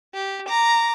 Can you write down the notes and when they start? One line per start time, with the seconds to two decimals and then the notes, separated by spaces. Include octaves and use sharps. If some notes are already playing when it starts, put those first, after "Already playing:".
0.14 G4
0.48 A#5 D6